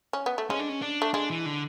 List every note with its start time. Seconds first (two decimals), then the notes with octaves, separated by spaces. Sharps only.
0.13 C#4
0.26 B3
0.38 A3
0.50 G#3 C#4
0.59 D4
0.69 C#4
0.82 D4
1.02 A3
1.14 G#3 D4
1.30 E3
1.46 D3